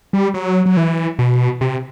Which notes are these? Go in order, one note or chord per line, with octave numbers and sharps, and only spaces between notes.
G3
F#3
F#3
E3
B2
C3